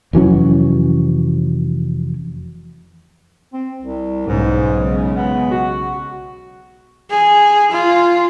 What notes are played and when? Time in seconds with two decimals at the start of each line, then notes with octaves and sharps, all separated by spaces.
0.13 F1 E3 F#3 C#4
3.53 C4
3.82 C2
4.27 B1 G#2 C#3 G#3
5.15 B3
5.51 F#4
7.11 G#4
7.72 F4